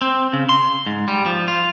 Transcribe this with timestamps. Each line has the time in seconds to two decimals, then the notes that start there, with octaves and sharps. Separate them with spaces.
0.02 C4
0.33 C#3
0.49 C6
0.86 G#2
1.08 G3
1.26 F3
1.48 F4